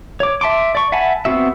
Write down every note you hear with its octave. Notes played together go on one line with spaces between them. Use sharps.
C#5 D6
E5 A5 C6 D6
D5 C#6
E5 F#5 G#5 A5 B5
B3 C4 F#4 E5